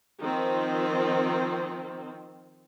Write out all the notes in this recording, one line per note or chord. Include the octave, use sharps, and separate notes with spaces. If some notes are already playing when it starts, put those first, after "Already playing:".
D#3 F3 C4